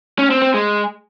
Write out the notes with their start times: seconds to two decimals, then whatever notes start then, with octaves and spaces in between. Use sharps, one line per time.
0.18 C#4
0.30 C4
0.42 C4
0.54 G#3